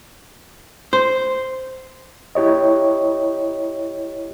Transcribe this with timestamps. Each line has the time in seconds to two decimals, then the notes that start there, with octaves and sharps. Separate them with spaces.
0.93 C5
2.35 E4 G4 C#5 D#5